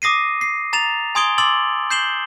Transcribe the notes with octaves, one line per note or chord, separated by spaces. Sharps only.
D6 D#6 A#6 C7 D#7
C7
A#5 A6 E7 F7
G#5 C6 D#6 G#6 D7 G7
C6 D6 E6 A6 F#7
G6 C7 E7 F#7 G7